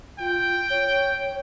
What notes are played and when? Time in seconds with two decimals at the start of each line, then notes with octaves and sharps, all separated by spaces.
0.19 F4 G5
0.70 C#5